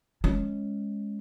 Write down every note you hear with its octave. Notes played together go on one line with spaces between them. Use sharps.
G#3 C#4